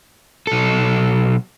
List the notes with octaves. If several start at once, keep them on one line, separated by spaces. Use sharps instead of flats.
B1 A4